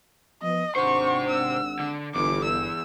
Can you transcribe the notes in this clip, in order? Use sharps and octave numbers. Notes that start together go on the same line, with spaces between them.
F3 B3 D#5
G#1 C3 D4 C5 F#5 C#6
E6
D3
G1 E2 D6
E6